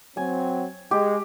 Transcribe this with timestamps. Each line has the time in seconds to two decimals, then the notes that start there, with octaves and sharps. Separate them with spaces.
0.17 F#3 C4 G#5
0.91 G#3 G4